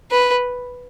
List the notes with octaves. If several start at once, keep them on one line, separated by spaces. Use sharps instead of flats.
B4